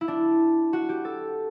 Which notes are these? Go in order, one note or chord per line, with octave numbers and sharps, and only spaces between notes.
E4
D4
F#4
G4
A4